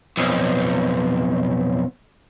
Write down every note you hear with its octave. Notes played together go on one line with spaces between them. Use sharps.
B1 F2